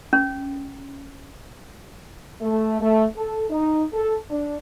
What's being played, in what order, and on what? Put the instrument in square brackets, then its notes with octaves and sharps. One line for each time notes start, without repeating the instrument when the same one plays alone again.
[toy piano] C#4
[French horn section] A3
A3
A4
D#4
A4
D4